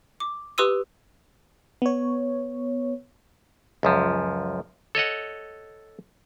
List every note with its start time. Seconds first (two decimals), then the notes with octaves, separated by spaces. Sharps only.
0.20 D6
0.58 G4 B4 C6 D#6 E6 D#7
1.82 B3 C#5
3.83 C#2 F#2 F3
4.95 A4 C#5 D#5 F#5